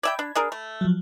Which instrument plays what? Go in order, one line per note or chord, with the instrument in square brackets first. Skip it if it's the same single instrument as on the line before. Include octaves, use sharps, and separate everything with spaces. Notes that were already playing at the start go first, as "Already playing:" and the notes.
[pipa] D5 E5 G5 [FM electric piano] B5 G#6
[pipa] D4
D4 G#4 A#4
A3
[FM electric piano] F3 F#3